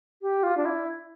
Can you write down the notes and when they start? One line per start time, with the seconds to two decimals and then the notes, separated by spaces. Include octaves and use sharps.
0.22 G4
0.43 F4
0.57 D4
0.65 E4